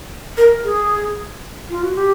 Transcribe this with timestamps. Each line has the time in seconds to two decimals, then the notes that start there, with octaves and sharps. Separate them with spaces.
0.38 A#4
0.65 G#4
1.70 F4
1.83 F#4
1.97 G4